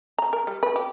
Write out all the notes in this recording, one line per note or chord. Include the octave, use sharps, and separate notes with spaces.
A#5
A#4
G3
B4
G4